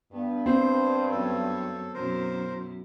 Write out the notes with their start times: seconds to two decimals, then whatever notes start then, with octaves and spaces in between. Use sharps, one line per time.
0.13 G2 B3
0.46 C4 C5
1.11 F#2 B3 A4 C#5
1.94 F#2 B2 E4 A#4 C5